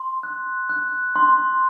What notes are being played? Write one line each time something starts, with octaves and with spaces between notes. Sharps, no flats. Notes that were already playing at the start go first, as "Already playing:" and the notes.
Already playing: C6
F#6
F#6
C6